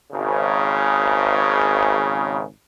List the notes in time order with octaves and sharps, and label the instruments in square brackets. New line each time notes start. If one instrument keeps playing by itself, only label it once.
[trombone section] G#1 C#3